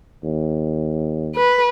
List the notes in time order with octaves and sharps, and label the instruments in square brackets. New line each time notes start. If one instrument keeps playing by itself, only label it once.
[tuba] D#2
[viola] B4